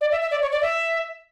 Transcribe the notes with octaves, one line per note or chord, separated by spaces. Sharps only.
D5
E5
E5
D5
C#5
D5
E5